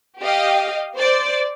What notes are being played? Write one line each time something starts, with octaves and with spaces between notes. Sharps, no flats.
G4 D#5 F5 G5
C5 D5